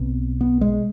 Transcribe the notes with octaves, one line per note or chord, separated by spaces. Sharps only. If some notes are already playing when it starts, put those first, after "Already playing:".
Already playing: B1 B2 C4
B3
G#3